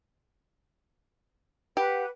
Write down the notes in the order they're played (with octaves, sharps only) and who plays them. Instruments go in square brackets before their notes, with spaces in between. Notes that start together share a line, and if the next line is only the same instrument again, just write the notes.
[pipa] G4 [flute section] B4 F#5